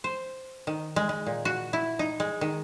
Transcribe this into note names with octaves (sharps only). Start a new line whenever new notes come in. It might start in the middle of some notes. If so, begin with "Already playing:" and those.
C5
D#3
G#3
G#3
A#2
F#4
E4
D#4
G#3
D#3